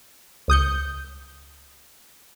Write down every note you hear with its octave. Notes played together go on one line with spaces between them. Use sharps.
C#2 D#6 G6 C#7